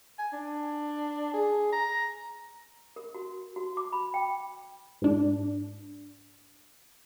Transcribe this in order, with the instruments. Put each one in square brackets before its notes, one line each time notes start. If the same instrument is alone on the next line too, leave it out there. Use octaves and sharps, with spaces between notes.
[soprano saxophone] G#5
D4
G#4
A#5
[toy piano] A#4
F#4
F#4
D6
B5
G5
[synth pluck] G#2 D4